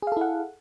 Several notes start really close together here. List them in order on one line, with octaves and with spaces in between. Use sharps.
G#4 F5 A4 E4 F#5